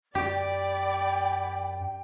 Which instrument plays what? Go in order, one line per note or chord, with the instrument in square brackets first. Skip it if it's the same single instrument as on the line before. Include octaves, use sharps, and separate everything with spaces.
[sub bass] F#2 [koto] G4 [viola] D5 B5 [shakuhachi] G5